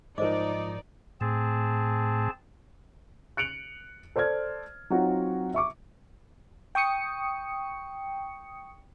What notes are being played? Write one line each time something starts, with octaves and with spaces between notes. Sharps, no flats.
G#2 F3 D#4 A#4 C5 D5 D#5 D6
A2 C4 G#4 A5
F#6 C#7 D7 F7 F#7
A4 C5 D5 F6 G#6
F#3 C4 D#4 F4 F#4
E5 C#6 D6
G5 C#6 D#6 C#7